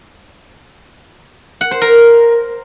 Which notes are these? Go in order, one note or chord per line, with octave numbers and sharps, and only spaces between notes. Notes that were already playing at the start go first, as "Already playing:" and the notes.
F#5
C5
A#4